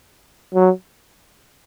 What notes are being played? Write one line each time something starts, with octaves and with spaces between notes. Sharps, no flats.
F#3